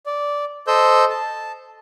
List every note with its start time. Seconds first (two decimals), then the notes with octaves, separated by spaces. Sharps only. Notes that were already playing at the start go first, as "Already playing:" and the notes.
0.06 D5
0.67 A4 C5 D#5 E6 G6
1.10 A5